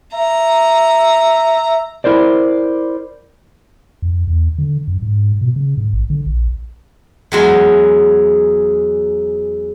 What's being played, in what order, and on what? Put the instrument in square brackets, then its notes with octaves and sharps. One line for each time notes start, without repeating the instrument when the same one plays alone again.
[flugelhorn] E5 [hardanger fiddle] A#5
[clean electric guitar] E4 A#4 C5 D5
[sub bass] F2
E2
D3
F#2
G#2
B2
C#3
G#2
A1
D3
A#1
[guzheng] E2 F#3 G#3